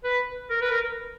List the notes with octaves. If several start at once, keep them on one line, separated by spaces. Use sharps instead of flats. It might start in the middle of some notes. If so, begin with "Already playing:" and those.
B4
A#4
B4
A#4